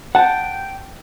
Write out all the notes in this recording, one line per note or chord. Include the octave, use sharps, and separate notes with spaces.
F#5 G5 A5